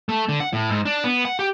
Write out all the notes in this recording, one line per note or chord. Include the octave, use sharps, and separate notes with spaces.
A3
D3
F#5
A2
G#2
D4
B3
F#5
G4